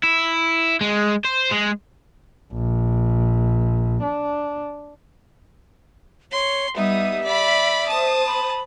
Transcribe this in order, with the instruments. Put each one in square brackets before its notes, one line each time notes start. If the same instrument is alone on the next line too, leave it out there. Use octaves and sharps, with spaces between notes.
[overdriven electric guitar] E4
G#3
C5
G#3
[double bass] A#1
D4
[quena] C#5 [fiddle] C6
[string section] G3 D#6 [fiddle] B3 D#4 [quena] E5
[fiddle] D5 B5 [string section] B6
[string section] C5 D#6 [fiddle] A5
[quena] B5